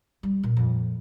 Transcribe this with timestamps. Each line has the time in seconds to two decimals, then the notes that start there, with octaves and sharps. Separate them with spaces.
0.23 G3
0.43 A#2
0.57 F2 A#2